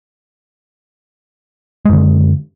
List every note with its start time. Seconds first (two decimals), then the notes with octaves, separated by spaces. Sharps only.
1.85 G#3
1.89 F#2
1.93 D3